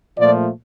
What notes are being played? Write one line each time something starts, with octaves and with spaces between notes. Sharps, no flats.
A#2 F3 A3 D5